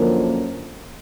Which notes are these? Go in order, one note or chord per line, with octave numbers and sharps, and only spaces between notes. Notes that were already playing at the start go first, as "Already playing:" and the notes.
Already playing: F#2 D3 F3 A#3 C#4